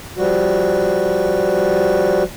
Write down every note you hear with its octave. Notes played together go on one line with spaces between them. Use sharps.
F3 G3 F#4